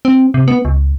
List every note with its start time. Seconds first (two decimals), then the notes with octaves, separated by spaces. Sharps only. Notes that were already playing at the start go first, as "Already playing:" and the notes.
0.05 C4
0.34 C3
0.48 B3
0.65 C#2